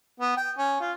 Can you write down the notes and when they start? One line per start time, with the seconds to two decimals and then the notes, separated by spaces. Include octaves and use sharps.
0.20 B3
0.36 G5
0.58 C#4
0.81 F4